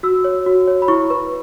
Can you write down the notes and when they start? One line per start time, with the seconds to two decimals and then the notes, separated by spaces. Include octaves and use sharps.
0.03 F#4 E6
0.24 C#5
0.46 F#4
0.68 C#5
0.82 B5
0.88 E4 C#6
1.10 B4